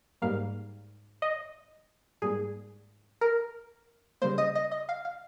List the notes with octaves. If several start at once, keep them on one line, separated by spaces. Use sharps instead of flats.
G#2 G3 A#3 F5
D#5
G#2 G3 A#3 G#4
A#4
C#3 G3 A#3 C5
D#5
D#5
D#5
F5
F5